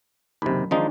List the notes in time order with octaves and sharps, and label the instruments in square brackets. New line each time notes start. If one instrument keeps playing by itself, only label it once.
[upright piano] F#1 B5 [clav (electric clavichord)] D#2 C3
[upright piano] D#3 D4 G#5 [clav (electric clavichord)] F3 G#3 D#4